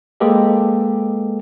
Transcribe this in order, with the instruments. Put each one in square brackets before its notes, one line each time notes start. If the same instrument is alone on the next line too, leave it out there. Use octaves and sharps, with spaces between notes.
[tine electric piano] G#3 A#3 G4 A4 B4 D#5